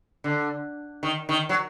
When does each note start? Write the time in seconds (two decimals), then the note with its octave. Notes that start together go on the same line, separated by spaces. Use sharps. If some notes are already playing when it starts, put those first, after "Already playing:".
0.24 D3
1.03 D#3
1.29 D#3
1.49 F#3